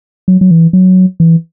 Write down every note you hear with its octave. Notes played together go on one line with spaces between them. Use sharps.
F#3
F#3
E3
F#3
E3